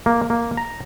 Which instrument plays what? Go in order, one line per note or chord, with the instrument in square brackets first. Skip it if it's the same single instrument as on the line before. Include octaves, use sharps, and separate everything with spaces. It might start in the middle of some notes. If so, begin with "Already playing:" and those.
[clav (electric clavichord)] A#3
A#3
A#5